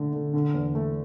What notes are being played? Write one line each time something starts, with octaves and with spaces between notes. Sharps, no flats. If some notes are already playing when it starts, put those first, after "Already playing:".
Already playing: D3 A3
D3
D3
E2
A3